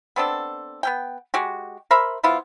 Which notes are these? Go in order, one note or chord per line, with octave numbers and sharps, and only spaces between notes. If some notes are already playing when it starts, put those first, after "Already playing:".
B3 C4 D4 A4
B3 C#4 G5
G#3 F#4 G4
A#4 C5 E5 B5
F3 B3 E4 F4